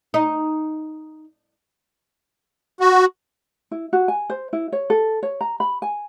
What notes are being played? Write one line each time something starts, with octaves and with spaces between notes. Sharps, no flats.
D#4
F#4
E4
F#4
G#5
C5
E4
C#5
A4
C#5
A#5
B5
G#5